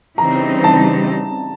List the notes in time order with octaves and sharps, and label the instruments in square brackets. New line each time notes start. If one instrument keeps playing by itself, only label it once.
[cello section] C#3 E3 G3 C4 D#4 [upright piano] A#5
[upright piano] A5